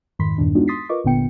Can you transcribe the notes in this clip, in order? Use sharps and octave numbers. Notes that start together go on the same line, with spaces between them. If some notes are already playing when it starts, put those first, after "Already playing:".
F2 G#2 D#3 B5 C6 B6
E2 G2 A#2 D#3 D4
G#3 B3 D4 D#4 F4 F#4
C6 D#6 A6 B6 C7
F4 A#4 B4 D#5 C#6 D6
G1 A#2 D3 B3 G5 C#7